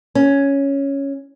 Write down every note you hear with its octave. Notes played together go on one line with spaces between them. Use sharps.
C#4